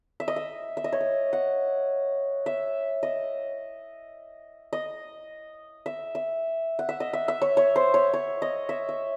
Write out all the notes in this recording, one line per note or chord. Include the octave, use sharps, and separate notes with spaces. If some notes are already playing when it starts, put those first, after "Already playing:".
E5
D#5
E5
E5
D#5
C#5
D#5
F#5
E5
D#5
D#5
E5
E5
F#5
E5
D#5
E5
E5
C#5
C#5
C5
C#5
C#5
D#5
E5
E5